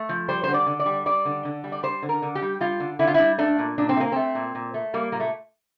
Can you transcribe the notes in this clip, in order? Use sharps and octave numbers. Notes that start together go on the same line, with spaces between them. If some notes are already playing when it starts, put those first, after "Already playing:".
Already playing: A3
F3
G3 C5
D3 C5
D5
D3
D5
G3
G3 D5
D3
D3
G3
D5
G3 C5
D3
A#4
D3
G4
G3
G3 F4
D3
D3 E4
F4
E4
G3
A3 D4
A#2
A#2 D4
C4
A3
A#3
A3 C4
A#2
A#2
A3
G3 A#3
A#2 A#3
A3